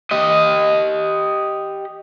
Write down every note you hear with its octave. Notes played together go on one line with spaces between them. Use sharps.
G4 D#5